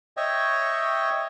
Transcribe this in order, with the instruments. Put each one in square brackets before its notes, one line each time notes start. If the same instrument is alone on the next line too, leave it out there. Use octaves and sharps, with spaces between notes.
[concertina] C#5 D#5 E5 G5 C#6